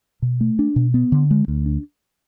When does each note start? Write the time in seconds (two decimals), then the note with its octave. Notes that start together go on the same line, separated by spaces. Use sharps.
0.22 B2
0.41 A3
0.59 D4
0.76 B2
0.94 B3
1.12 D3
1.31 G#3
1.48 D2
1.66 D4